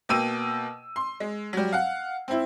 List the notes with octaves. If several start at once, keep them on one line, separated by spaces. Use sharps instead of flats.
B2 A#3 G5 E6 D#7
C6
G#3
F#3 G3
F5 F#5
C4 E4